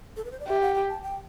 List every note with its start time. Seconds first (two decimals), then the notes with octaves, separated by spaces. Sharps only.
0.17 A4
0.25 B4
0.32 C5
0.40 D5
0.48 G4 E5
0.62 F#5
0.75 G5
0.89 A5
1.02 G5